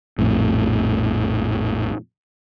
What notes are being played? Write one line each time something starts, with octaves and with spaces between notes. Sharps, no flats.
A#1 F2 A2